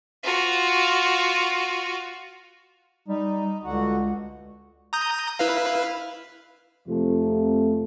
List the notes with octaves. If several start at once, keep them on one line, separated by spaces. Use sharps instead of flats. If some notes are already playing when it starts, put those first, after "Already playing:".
F4 F#4
G3 D#4
C#2 D3 F#4
A#5 D#6 G6
E4 B4 F5
F2 C3 F3 A3